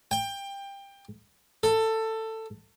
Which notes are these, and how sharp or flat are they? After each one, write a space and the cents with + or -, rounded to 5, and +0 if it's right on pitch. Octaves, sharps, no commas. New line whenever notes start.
G5 +20
A4 +15